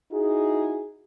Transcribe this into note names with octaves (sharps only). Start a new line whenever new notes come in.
D#4 E4 F#4 G#4